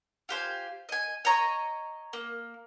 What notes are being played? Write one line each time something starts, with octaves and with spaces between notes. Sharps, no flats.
F4 G4 C5 G#5
D#5 G#5
C#5 D#5 A#5 C#6
A#3